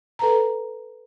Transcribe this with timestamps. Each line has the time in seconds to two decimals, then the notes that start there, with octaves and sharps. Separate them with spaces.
0.19 A4 B4 A5 A#5